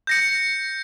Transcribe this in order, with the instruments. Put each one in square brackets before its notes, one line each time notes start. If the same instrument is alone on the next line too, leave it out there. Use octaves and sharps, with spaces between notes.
[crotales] G6 A#6 C#7